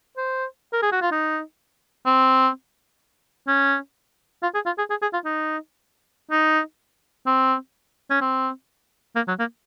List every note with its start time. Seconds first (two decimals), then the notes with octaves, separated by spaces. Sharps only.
0.17 C5
0.73 A#4
0.82 G#4
0.92 F#4
1.01 F4
1.12 D#4
2.06 C4
3.48 C#4
4.43 F4
4.54 G#4
4.66 F4
4.78 G#4
4.90 G#4
5.02 G#4
5.13 F4
5.25 D#4
6.31 D#4
7.26 C4
8.10 C#4
8.21 C4
9.16 A#3
9.28 F#3
9.39 A#3